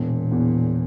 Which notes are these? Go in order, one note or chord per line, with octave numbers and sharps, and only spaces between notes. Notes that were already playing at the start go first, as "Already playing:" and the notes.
Already playing: E1 A#2
E2